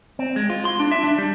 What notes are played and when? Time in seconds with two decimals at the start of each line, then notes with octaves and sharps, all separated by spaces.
0.19 C4
0.36 G#3
0.50 F4
0.65 C6
0.80 D4
0.91 E5
1.04 D4
1.18 G3